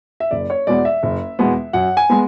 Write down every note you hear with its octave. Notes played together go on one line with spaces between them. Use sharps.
E5
F#1 D5
C#5
E2 B2 G#3 B3 D5
E5
F#1
E2 B2 G#3 B3
F#2 F#5
G#5
G#3 B3